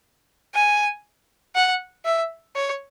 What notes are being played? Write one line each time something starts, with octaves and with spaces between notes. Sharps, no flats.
G#5
F#5
E5
C#5